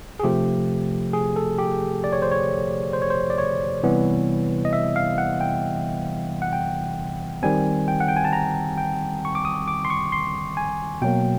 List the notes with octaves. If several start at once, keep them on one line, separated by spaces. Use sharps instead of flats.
G#4
C3 F3 A3 G4
G#4
A4
G4
D5
C#5
C5
C#5
C5
C#5
C5
D5
C#5
C3 E3 G3 B3
D#5
E5
F5
F#5
G5
F#5
G5
D#3 G3 C4 G#5
G5
F#5
G5
G#5
A5
A#5
G5
C#6
D6
D#6
D6
C6
C#6
C6
G#5
B2 F#3 A#3 G5